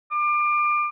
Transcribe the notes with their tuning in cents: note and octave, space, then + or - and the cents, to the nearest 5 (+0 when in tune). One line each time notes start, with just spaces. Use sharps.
D6 +30